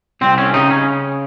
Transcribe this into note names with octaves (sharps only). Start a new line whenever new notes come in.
C2 C4
C#4
C#3 D#4
C#4